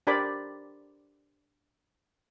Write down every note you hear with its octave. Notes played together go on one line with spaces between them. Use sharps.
D4 G4 A#4 C5 D5 B5